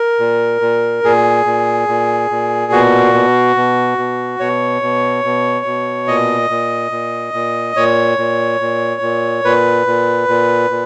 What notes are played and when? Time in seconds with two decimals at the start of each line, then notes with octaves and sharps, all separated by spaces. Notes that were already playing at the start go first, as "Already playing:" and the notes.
Already playing: A#4
0.19 A#2
0.61 A#2
1.04 A#2 G#4
1.46 A#2
1.88 A#2
2.30 A#2
2.72 B2 F#4
3.14 B2
3.56 B2
3.98 B2
4.40 B2 C#5
4.82 B2
5.24 B2
5.66 B2
6.08 A#2 D#5
6.50 A#2
6.91 A#2
7.34 A#2
7.76 A#2 C#5
8.18 A#2
8.61 A#2
9.01 A#2
9.44 A#2 B4
9.87 A#2
10.28 A#2
10.70 A#2